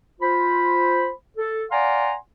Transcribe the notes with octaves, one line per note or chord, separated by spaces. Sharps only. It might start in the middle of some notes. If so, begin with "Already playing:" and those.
F4 C5 B5
A4
D5 F5 F#5 G#5 A#5 C6